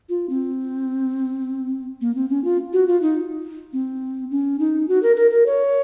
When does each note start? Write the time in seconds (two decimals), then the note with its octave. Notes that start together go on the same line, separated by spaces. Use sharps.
0.09 F4
0.30 C4
2.01 A#3
2.15 C4
2.30 C#4
2.44 F4
2.73 F#4
2.88 F4
3.02 D#4
3.73 C4
4.31 C#4
4.59 D#4
4.88 F#4
5.03 A#4
5.16 A#4
5.31 A#4
5.46 C#5